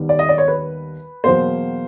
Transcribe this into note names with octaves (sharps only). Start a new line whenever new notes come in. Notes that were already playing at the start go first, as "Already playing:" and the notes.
Already playing: D#2 D#3 G3 B3
D5
D#5
D5
C#5
B4
E2 B2 F#3 A#3 C5